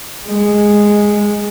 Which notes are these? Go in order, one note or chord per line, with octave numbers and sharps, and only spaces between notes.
G#3